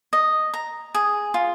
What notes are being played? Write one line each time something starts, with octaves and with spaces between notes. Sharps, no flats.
D#5
A#5
G#4
F4